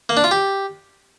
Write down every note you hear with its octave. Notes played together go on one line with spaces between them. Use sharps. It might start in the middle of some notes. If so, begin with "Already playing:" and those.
A#3
D4
F4
G4